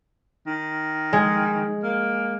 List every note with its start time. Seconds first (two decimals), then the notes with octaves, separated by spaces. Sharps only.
0.46 D#3
1.13 G#3
1.83 A#3